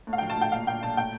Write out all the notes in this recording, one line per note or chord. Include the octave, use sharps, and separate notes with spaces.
A2
F5
F3 G5
A5
A2 G5
A#2 F5
A#2 G5
A#2 A5
A2 G5